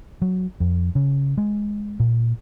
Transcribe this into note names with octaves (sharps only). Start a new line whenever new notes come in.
F#3
F2
C#3
G#3
A#2